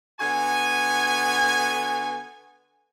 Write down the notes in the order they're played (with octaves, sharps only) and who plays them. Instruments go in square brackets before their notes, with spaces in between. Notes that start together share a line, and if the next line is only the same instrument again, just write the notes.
[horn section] D3 B3 F#4 G#5